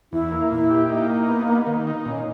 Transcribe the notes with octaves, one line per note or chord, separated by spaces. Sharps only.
E2 E4
A#3
A#2 E4
G4
A#3 D#4
D#4
B3
B3
D#3
D#4
A#2 C#4